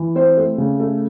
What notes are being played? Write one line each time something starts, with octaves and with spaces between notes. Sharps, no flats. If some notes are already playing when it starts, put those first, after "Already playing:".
Already playing: E3
C4 C5
A3
C#3
A3